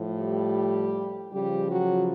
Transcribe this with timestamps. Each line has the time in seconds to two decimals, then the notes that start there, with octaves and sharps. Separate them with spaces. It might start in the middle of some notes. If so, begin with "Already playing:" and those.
Already playing: A2 F3
0.18 G3 G4
1.32 C#3 F3 G3 G4
1.70 F#3 F#4